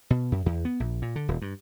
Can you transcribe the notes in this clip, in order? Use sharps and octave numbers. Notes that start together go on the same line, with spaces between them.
B2
F#2
E2
B3
A#1
A#2
D3
D#1
G2